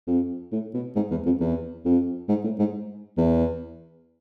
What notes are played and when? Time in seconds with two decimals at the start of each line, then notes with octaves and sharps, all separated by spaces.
0.07 F2
0.52 A2
0.74 B2
0.95 G#2
1.11 E2
1.25 F2
1.40 E2
1.85 F2
2.29 G#2
2.44 A2
2.59 G#2
3.17 E2